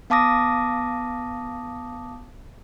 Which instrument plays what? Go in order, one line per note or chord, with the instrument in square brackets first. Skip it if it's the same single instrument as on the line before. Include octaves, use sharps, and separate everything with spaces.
[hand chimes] B3 F5 A5 D6 D#6 A#6